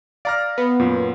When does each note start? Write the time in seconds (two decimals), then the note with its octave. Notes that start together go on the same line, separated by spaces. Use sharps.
0.25 D5 F5 A#5 F6
0.58 B3
0.80 F#2 A#2